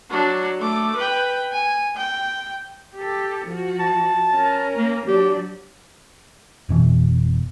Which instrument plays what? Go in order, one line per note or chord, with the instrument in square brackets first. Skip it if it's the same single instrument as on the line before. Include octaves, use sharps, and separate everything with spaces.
[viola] F#3 D4
A3 D6
B4 G5
G#5
G5
[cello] G4 A4
F3 F#4
[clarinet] A5
[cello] C#4 A#4
[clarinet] A#3
[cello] F#3 D4 [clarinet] G4
[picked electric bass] F1 B2 E3